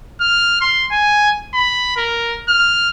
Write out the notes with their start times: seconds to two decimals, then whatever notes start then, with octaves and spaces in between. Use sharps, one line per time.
0.21 F6
0.61 C6
0.91 G#5
1.54 B5
1.97 A#4
2.49 F6